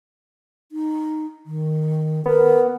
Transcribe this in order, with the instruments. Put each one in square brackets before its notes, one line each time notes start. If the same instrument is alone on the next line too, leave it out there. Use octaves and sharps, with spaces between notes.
[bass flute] D#4
D#3
[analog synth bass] B3 [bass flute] A#4